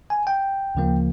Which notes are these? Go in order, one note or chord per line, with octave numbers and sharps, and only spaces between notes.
G#5
G5
D2 C#3 F3 A#3